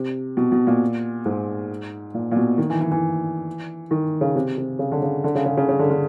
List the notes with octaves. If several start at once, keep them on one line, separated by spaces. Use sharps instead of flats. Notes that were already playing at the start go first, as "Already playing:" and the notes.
Already playing: C3
B2
B2
A#2
G#2
A#2
A#2
B2
D#3
E3
E3
E3
D#3
C#3
C3
C3
C#3
D3
C#3
D3
C#3
C#3
C#3
C#3
D3
D3